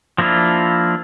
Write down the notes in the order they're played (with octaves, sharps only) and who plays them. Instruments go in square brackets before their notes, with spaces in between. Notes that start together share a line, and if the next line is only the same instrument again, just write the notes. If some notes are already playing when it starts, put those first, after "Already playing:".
[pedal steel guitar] F3 A#3 D4 E4 F4